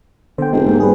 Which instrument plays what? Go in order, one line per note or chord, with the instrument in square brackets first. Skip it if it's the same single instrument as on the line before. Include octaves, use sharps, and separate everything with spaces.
[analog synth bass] D3 [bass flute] B3 [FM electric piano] C5 G5
[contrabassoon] F1 [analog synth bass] G#3
[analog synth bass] G#2 [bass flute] A#3
[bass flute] G3 [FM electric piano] G#4 B4